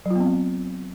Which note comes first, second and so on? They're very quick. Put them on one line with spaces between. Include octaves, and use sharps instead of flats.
F#3 F4 B3 C4